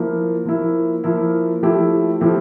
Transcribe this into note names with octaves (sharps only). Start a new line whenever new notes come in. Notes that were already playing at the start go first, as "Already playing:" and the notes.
Already playing: F3 A#3 E4
F3 A#3 E4
F3 A#3 E4
F3 A3 E4 G4
F3 A3 E4 G4